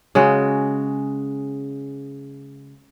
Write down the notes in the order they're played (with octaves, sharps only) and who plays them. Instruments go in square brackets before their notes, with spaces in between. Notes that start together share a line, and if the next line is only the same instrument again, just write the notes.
[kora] C#3 G#3 F#4